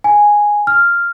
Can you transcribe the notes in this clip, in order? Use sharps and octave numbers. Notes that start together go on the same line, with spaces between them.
G#5
F6